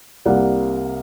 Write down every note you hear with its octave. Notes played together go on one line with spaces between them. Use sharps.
C2 C3 G3 A#3 D5 F#5